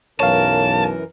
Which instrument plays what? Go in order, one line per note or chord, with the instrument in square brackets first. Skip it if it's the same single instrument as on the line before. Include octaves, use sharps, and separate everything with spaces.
[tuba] B1 [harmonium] F#2 E3 A#4 [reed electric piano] C#5 F5 [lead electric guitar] A5